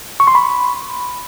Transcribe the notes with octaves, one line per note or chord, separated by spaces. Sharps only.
C#6
C6
B5